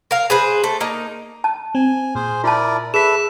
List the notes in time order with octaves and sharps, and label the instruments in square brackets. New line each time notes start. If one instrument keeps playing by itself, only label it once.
[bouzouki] A#4 F5
G#4 B4 C5
A3
A#3 D#4
[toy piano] A5
[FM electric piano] C4 [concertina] G#5
[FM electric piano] A#2 [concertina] G#4 C5
[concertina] E4 A#4 D5 [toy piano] F4 A5
[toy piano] G#4 [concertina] A4 B4 E5 [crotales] B6 E7